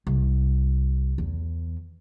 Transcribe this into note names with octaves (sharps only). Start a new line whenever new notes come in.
C2
E2